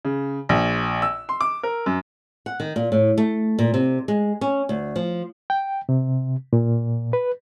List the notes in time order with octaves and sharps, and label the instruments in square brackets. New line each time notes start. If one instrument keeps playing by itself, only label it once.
[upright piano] C#3
A#1
E6
C6
D6
A#4
F#2
[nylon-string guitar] F#5
D#3
A#2
A2
A3
A#2
C3
G#3
C#4
D2
F3
[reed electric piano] G5
C3
A#2
B4